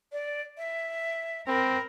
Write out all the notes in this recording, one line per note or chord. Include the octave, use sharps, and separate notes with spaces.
D5
E5
C4 A#4 B5